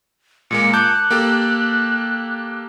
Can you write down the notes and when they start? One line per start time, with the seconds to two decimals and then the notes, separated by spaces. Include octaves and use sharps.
0.51 A#2 G#3 A#3 C#7
0.73 A5 D6 F#6 G6
1.11 A#3 G4 A4